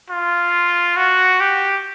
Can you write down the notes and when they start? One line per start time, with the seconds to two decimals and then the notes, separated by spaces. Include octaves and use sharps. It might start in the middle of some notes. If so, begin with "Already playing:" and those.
0.10 F4
0.97 F#4
1.41 G4